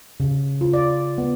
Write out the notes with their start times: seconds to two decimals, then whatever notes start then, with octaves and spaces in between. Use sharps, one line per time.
0.20 C#3
0.61 F4
0.74 D5
1.18 B3